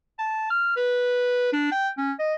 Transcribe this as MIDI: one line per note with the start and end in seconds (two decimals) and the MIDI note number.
0.18 0.47 81
0.50 0.73 89
0.76 1.50 71
1.53 1.67 62
1.71 1.88 79
1.97 2.12 61
2.19 2.34 75